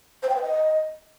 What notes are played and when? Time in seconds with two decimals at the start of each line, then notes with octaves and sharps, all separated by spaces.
0.23 C5
0.29 G5
0.36 B4
0.42 D#5